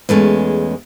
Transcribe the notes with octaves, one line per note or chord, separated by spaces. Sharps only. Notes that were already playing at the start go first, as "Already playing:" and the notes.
E2 G#3 A3 C#4